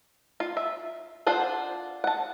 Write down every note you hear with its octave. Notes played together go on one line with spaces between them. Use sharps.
F4
E5
D4 F4 C5 F#5
F#5 A5